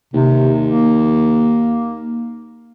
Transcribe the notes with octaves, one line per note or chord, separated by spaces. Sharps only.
D#2 C3
A#3